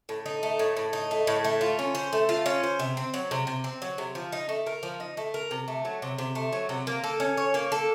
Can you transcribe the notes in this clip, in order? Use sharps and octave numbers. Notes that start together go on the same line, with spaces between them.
A2
D#4
A3
A2
A2
D#4
A3
A2
A3
F4
C#4
C5
A3
F4
C#4
C5
C3
C4
F#3
C3
C3
C4
F#3
C3
F3
D#4
A3
A#4
F3
D#4
A3
A#4
C3
A3
F#3
C3
C3
A3
F#3
C3
A#3
A4
C#4
C#5
A#3
A4